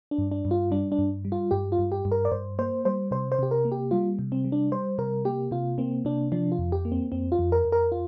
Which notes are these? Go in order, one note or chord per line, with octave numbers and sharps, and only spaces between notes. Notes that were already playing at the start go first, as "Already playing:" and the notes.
D4
G2
D4
G2
F4
G3 D4
D4
G2
G3
F4
G2 G4
F4
G2
G4
G2
A#4
D5
G2 C5
A#3 C5
G3 C5
C3 C5
C5
C3 G4
A#4
A#3
G4
G3 F4
C3
C4
G3
D4
G3 C5
C3 A#4
A#3 G4
C3 F4
A#3 C4
C3 D4
F3 D4
F4
F2
G4
A#3
C4
F2 C4
F4
F2
A#4
F2
A#4
F4